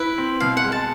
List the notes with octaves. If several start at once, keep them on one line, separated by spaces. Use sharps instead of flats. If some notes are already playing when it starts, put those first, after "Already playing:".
Already playing: E4 B4
C4
B2 F5
F#5
G#3
A5